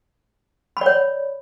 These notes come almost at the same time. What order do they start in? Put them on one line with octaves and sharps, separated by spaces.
B5 D5 C#5